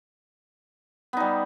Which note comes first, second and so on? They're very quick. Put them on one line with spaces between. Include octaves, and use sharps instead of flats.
B3 D#4 G3